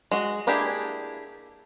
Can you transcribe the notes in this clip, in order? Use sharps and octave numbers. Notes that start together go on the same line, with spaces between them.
G#3 F#4
A#3 D4 E4 G4 G#4